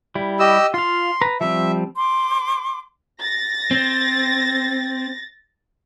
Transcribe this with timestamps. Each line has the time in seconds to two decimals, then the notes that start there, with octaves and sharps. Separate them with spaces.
0.15 G3 E4
0.40 G4 D#5 E6
0.74 F4 F5 C6
1.21 B4 A#5
1.41 F3 G3 C4 E5
1.96 C6 D6
3.19 A6 A#6
3.71 C4